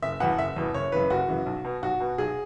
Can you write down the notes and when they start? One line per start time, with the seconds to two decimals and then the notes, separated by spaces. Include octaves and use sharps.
0.02 F#1 E5
0.20 E2 B2 F#5
0.39 F#1 E5
0.56 E2 B2
0.74 F#1 C#5
0.92 F#2 C#3 E3 B4
1.10 F#1 F#4
1.28 F#2 C#3 E3
1.46 B1
1.65 B2
1.82 B1 F#4
2.00 B2
2.18 B1 G#4